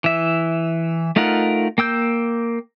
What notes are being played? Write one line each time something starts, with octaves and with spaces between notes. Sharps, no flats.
E3 E5
A3 D#4 F4 A#4 F#5
A#3 G5 E6 G6